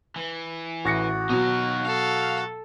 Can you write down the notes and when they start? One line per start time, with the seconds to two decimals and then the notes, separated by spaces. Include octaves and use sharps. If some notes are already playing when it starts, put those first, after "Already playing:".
0.16 E3
0.85 A1 F#4 A#6 C#7
1.30 B2 F#3 D#4 F5
1.86 A4 F5